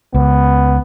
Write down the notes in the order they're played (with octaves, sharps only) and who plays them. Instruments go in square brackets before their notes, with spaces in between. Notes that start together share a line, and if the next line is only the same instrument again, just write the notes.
[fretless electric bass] C#2 [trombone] B3